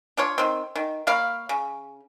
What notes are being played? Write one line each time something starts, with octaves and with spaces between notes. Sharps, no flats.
D4 F4 C#5
D#3 C4
D#3
A#3 C#5 F5 B5
C#3